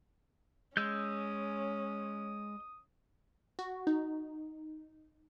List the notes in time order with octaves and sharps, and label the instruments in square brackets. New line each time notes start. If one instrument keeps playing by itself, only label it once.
[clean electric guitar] G#3 [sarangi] C#4 [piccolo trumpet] D#6 [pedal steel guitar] E6 G6
[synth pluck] F#4
D#4